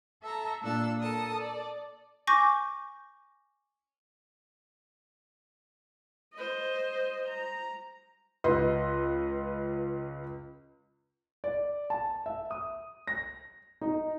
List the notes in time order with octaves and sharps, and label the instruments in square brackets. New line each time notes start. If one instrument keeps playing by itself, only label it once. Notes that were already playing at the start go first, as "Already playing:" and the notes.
[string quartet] A4 E5 A5 A#5
A#2 D4 A4 E6
A4 A#4 A5 D#6
D5
[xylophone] G#5 C#6 D6 G6 A#6
[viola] C5 D#5
A#5
[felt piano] C#2 B4 D#5 C6
[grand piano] D5
A5
E5
D#6
A#6
D#4